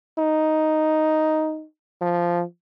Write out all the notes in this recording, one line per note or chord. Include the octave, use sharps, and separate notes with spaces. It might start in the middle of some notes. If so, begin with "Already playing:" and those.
D#4
F3